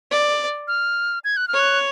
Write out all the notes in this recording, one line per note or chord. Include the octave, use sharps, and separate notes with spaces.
D5
F6
G#6
F#6
F6
C#5
F#6